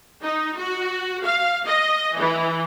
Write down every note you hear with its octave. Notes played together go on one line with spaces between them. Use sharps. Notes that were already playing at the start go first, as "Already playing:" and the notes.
D#4
F#4
F5
D#5
E3